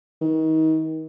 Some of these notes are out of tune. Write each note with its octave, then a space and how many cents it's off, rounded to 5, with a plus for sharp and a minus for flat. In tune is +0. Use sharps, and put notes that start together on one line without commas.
D#3 +30